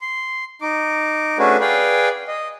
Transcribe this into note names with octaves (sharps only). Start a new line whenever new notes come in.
C6
D#4 D6
A3 C#4 D4 F#4 G#4 B4
G#4 B4 D5 F5 G5
D#5